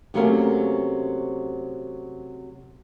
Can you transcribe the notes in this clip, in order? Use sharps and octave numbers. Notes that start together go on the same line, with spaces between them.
C3 F#3 A3 A#3 C#4 A#4